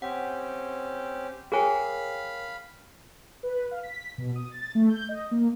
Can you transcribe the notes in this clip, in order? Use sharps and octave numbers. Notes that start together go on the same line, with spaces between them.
C4 C#4 G4 F#5
G#4 A#4 C#5 F5 G5 G#5 B5
B4
F5
B6
B2
D#6
A6
A3
G6
D#5
A#3